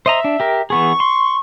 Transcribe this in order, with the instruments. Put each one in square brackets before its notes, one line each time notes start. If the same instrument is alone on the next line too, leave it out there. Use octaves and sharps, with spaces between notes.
[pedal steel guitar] C5 D#5 A#5 [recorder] E5
[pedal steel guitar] D4
G4 A#4
[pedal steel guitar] E3 B3 G#4 [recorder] C#6
[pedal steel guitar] C6